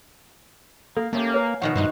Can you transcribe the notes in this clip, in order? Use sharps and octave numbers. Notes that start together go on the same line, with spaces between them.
A#3 A4
A3 A#3 C#4 G4
B4 C#5 F5 G#5
B2 D#3 F3 F#5 C#6 F#6
G2 D#4 F#4 C5